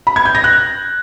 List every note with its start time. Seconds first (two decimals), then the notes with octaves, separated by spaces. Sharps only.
0.07 B5
0.16 G#6
0.25 G6
0.35 A#6
0.44 F#6